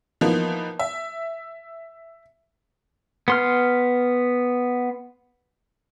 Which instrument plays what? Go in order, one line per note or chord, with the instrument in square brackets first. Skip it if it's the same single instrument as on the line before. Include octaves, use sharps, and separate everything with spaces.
[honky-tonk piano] E3 F3 A#3 B3 D#4
E5
[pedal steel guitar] B3 C6 F6